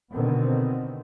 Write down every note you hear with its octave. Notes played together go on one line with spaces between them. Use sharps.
B2 D3 D#3 B3 C4